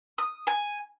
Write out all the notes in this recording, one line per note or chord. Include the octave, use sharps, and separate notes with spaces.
D#6
G#5